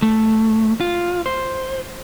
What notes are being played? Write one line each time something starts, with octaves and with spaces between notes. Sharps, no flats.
A3
F4
C5